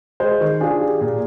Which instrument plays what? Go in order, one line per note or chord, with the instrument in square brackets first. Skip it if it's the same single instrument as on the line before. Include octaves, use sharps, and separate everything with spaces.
[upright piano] G#3 [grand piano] C5 D#5
[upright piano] D#3
[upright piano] D4 [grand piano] F4 G#4
[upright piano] G4
A#2